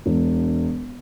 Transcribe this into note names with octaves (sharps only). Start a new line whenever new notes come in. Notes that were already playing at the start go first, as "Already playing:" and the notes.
E1